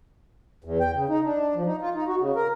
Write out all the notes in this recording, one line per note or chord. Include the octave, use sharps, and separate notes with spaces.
E2
G5
C#3
D#4
D4
F3
D#4
F4
D#4
F#4
C#3
A#4